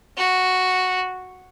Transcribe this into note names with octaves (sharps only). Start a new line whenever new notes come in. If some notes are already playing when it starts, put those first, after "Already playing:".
F#4